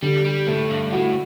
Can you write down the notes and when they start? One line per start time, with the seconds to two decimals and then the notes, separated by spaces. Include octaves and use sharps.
0.02 D3 G3
0.25 G3
0.47 A2 A3
0.70 G2
0.92 A2 F#4